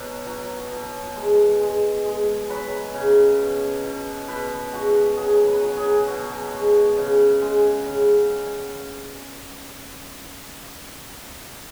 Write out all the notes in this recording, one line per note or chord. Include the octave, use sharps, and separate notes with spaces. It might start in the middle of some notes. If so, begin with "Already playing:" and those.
Already playing: B2 F#3 D#4
F#3
B2
G#3
G#3
G#3
F#3 B4
C#3
B2
B2
B2 B4
G#3 F#4
F#3 G#4
B4
F#3
G#4
B2 F#4
G#3
C#3
G#3
C#3